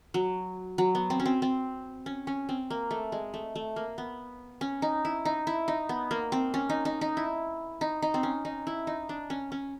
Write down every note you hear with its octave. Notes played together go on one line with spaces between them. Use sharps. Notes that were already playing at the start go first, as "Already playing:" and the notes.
F#3
F#3
B3
C4
C#4
C4
C4
C#4
C#4
C4
A#3
A3
G#3
A3
A3
A#3
B3
C#4
D#4
E4
D#4
E4
D#4
B3
A#3
C4
C#4
D#4
D#4
D#4
E4
D#4
D#4
C4
C#4
D#4
E4
D#4
D4
C#4
C#4